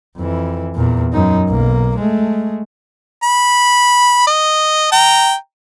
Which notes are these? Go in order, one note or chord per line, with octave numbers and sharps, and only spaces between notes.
F2 E3
E2 A#2
F#2 D#4
B1 A#3
G#3 A3
B5
D#5
G5 A#5